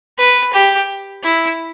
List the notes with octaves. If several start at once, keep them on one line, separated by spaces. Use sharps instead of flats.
B4
G4
E4